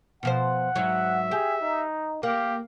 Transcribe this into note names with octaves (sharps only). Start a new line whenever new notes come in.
B2 F3 C5 F#5
G#2 F#3 E5
G4 G#4
D#4
A#3 G4 F5